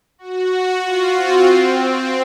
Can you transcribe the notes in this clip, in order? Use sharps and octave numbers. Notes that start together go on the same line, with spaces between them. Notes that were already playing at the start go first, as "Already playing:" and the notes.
F#4
F4
C4
C4